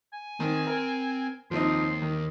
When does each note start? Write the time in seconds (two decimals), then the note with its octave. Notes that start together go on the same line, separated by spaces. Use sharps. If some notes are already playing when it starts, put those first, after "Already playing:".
0.13 G#5
0.40 D#3 C4 C5
0.67 A#4
1.51 D#2 F3 C4 D#4 C6
2.02 D#3